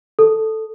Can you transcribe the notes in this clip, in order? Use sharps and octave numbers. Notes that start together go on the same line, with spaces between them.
A4